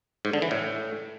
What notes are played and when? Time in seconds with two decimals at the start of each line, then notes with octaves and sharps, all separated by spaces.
0.25 G#2
0.33 D3
0.42 E3
0.51 A2